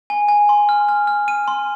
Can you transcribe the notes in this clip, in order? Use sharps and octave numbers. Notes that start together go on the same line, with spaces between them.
G#5
G#5
C6
F6
F6
F6
F6 D#7
C6